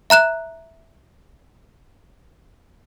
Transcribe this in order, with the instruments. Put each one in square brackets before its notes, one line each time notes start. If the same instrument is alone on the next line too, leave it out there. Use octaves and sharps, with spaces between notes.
[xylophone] E5 A#5 F#6 E7